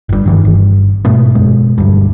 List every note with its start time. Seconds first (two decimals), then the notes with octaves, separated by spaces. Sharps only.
0.09 G1 G2
0.26 G2 D#3 E3
0.45 G1
1.05 G#2 B2 A3 B3
1.35 F#2 B2 G#3
1.78 D2 G2